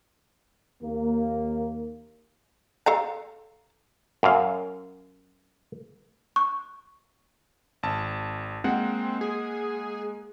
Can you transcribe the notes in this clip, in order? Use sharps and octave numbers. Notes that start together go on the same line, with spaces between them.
D#2 A#3
A4 F5 A#5
F#2 F5
C#6
G#1 A5
G#3 A#3 C4 F#5
G#4